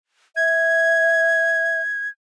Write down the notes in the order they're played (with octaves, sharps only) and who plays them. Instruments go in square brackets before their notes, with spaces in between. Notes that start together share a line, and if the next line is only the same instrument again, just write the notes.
[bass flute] E5 [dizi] G#6